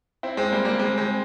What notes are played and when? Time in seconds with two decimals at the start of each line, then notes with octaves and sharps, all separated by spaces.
0.23 C4 E4
0.37 G#3 C4
0.52 G3 A#3
0.65 G3 A#3
0.79 G#3 C4
0.98 G#3 C4